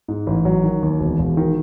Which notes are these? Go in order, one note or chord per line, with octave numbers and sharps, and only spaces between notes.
G#2
A1
F#3
D#3
D#2
E1
E1
D#3